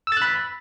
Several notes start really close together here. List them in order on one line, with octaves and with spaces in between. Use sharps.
E6 A6 F#6 B5